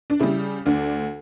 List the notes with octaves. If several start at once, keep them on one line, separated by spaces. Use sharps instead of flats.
D4
C#3 G3 E4
D2 D4